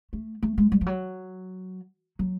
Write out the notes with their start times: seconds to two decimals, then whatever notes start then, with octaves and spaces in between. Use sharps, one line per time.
0.13 A3
0.43 A3
0.58 G#3
0.72 G3
0.81 F3
0.86 F#3
2.19 F#3